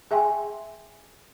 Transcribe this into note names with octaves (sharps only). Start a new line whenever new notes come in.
G#4 E5 G5 G#5 C6